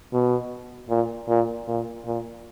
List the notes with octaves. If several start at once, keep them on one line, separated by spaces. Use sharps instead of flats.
B2
A#2
A#2
A#2
A#2